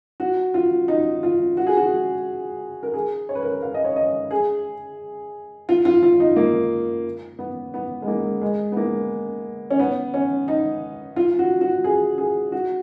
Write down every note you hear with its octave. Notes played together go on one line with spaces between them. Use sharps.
F#4
F4
D#4
F4
F#4
G#4
F#4
A#4
G#4
C#5
B4
A#4
B4
F5
D#5
C#5
D#5
G#4
F4
F4
F4
D#4
A#3
B3
B3
G#3
A#3
G#3
B3
A#3
C#4
B3
C#4
D#4
F4
F#4
F#4
G#4
G#4
F#4